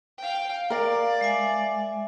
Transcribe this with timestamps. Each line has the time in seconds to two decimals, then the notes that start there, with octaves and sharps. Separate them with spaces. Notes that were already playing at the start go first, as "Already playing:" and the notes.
0.18 F5 G5
0.70 A#4 D5 F5
1.21 G#3 E5 G#5